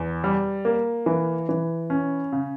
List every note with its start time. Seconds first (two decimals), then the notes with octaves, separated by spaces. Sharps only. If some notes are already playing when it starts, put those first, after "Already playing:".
Already playing: E2
0.24 G3
0.65 A#3
1.06 E3
1.49 E3
1.90 C#4
2.32 C#3